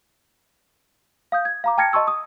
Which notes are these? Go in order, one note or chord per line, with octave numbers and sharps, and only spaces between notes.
F5 D#6 G6
G#6
F5 A#5 D6
G5 A5 F6 G#6 A#6 C#7
D#5 A5 C6 C#6 E6
D#6